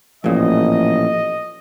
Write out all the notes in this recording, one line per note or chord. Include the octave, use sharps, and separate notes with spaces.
A1 F2 A#2 D#5